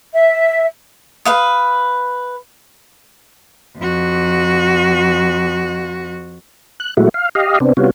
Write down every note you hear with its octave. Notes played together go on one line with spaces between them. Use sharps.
E5
B4 F5 D#6
F2 F#4
F#6
A#2 F#3 G#3 A3 E4 F#4
F5
G4 D#5 F5
C3 B3 C4 D4
C3 G3 B3 C#4 F4 F#4